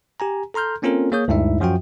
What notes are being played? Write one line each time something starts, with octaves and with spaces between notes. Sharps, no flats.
G4 G#5 A#5
A4 A#5 C6 F6 G6
A#3 C4 C#4 F4 A4 A#4
A#3 G#4 C#5 D#6 G6
D2 G2 G#3 D#4 E4 E5
F#2 F3 F4 F#4 G5